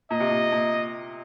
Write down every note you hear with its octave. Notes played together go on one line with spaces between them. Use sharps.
A#2 D#5
C3
A#2
A#2